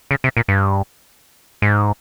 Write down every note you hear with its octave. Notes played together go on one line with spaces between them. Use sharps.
C#3
C3
A#2
G2
G#2